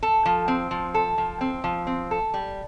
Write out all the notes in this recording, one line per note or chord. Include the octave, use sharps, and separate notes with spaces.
A4
F3
C4
F3
A4
F3
C4
F3
C4
A4
G3